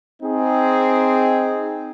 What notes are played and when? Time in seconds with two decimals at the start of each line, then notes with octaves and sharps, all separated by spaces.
0.22 C4 D#4 G#4